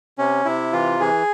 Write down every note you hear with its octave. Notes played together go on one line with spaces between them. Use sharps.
C3 C#4
C3 E4
E3 F4
E3 G#4